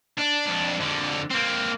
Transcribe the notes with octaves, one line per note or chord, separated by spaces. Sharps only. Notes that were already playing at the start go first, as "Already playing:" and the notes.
D4
F2 D4
F2 D3
A#3 C4